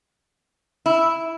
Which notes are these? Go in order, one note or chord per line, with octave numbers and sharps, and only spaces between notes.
E4